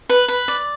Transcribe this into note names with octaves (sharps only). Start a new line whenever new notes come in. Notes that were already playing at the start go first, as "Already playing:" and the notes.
B4
B4
D5